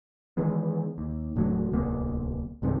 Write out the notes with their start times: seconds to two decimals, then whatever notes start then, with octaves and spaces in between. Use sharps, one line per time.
0.37 D#3 E3 G#3 B3
0.98 D#2
1.36 E1 A2 D3 F#3
1.72 D1 C2 A#3 B3
2.62 C2 G2 C3 D#3